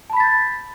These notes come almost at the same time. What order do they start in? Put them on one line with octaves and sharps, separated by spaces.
A5 B5 B6 A6 G6